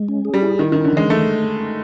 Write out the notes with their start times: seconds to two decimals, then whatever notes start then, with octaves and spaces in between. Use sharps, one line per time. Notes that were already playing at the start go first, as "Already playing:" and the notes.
Already playing: G#3
0.08 C#4
0.25 G#4
0.34 G3
0.42 E4
0.59 D#3 E4
0.72 D#3 C#4
0.84 D3
0.93 E3 G#3
1.10 G#3 A3